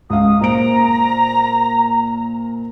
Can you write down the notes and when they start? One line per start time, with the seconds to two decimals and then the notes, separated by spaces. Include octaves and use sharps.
0.10 C#2 F5 D#6
0.41 A#2 C5 A#5 D7